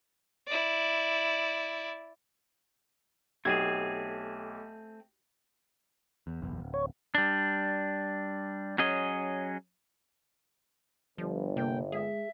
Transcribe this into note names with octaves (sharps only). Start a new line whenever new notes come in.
E4 D5
B1 A3 C4 G4 G#4 G#6
E2
F#1 B1 E2
D1
C#5
G3 D4
F#3 C#4 G#4 D#5
G1 F3
C3 A#3 G5
G#3 G#4 E5